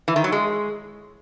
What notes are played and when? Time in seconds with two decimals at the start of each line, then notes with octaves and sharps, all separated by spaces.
0.08 E3
0.16 D#3
0.24 F#3
0.32 G#3